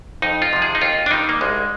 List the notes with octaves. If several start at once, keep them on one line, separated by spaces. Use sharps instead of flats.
F2 D#4
F4
C3 F3
G#4
D#4
D#2 F4
D4
D#3 G3 D#4
A#3
C2 G#3